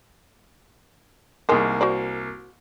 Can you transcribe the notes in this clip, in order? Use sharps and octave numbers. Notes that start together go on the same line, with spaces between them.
C2 D#3 G#3 A#3
F#4 C5 D5